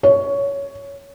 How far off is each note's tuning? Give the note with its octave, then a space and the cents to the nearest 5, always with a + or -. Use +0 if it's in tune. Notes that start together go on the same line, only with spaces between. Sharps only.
C#5 +10